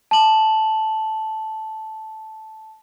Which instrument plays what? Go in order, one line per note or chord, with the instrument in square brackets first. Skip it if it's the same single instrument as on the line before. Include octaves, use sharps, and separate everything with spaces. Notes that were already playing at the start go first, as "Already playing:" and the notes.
[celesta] A5 F#7